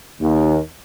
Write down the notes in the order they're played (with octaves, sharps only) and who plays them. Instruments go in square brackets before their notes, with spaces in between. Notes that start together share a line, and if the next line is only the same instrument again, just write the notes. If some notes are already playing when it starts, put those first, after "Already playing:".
[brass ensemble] D#2